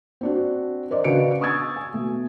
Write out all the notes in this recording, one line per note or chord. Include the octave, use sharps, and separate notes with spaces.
C4 D4 F#4
A#4 C5 D5 D#5
C#3 D4 F#4 B4 C#7 D7
C#6 D#6 E6 G#6 A6
G#5
B2 A3